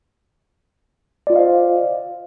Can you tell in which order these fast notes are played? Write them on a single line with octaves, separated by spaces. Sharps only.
D5 F4 D#5 F5 C5